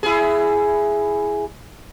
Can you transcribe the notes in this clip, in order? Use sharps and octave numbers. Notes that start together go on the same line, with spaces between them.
E4 G#4